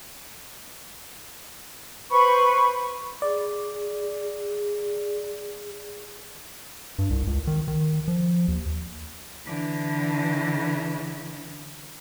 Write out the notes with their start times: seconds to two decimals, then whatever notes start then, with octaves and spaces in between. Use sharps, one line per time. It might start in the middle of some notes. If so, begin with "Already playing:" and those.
2.10 B4 C5 B5 C#6
3.22 G#4 D5
6.99 G2
7.10 C2
7.27 C#2
7.47 D#3
7.68 D#3
8.08 F3
8.48 D#2
9.45 D3 E3